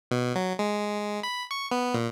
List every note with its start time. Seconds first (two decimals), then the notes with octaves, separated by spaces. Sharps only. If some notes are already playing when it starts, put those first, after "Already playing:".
0.11 B2
0.35 F#3
0.59 G#3
1.23 B5
1.51 C#6
1.71 B3
1.94 A#2